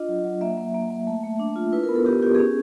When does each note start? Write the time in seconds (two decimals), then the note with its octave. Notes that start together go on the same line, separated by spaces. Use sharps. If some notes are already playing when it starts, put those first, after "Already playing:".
Already playing: D4 F4 D#5
0.08 F#3
0.24 F#3
0.41 A#3 E5
0.58 A#3
0.75 A#3
0.90 A#3
1.07 A3
1.24 A3
1.40 D4
1.56 F4
1.73 E4 B4
1.83 A#4
1.89 B3
1.95 A4
2.06 B3 G4
2.22 E4 G4
2.35 C#4 G#4